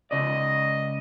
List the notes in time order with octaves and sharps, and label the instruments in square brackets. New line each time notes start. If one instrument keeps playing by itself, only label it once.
[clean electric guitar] C#2 C#3 D5 [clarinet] D#5